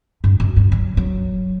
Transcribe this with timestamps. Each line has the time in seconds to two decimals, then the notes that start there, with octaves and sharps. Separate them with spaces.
0.24 G2
0.40 F#2
0.56 G2
0.72 F#3
0.97 F#3